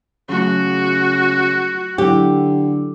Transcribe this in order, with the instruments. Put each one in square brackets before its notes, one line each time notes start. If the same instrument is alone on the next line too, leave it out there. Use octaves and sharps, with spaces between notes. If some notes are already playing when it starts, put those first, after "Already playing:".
[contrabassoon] C#3 [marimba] F#3 A3 G#4 [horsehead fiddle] F#4
[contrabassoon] D3 [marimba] F#3 E4 [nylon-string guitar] G4